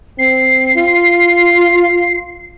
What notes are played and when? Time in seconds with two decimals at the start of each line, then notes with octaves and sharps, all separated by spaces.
0.19 C4 C7
0.75 F4